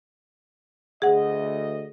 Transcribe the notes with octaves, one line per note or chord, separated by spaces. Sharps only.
D2 G#4 D#5 F#5